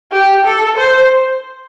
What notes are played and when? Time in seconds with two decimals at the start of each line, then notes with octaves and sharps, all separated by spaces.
0.12 G4
0.45 A4
0.78 C5